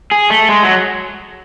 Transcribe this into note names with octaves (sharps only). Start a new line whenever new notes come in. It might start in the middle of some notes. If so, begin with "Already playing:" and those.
G#4
A3
G#3
F#3